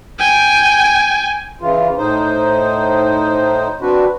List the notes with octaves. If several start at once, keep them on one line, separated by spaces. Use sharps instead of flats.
G5 G#5
C#3 E3 F4
A2 D#4 C5
C4 D4 F#4 B4